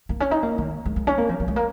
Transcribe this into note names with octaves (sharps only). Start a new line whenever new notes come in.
A#3
C#4
D#4
A#3
D#3
G#3
G#3
C#4
A#3
F3
F3
G#3
A#3